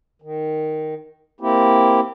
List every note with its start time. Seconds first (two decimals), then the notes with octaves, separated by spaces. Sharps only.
0.22 D#3
1.41 A#3 C4 E4 G4